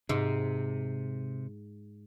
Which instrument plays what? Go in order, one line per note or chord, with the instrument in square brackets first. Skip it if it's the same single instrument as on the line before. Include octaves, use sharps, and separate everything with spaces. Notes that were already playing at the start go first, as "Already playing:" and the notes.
[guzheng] G#2 [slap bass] C3